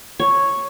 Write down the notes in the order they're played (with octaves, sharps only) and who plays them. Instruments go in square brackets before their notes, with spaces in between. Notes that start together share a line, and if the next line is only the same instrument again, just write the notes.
[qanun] C#5